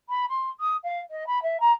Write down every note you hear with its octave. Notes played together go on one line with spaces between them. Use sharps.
B5
C6
D#6
F5
D#5
B5
E5
A#5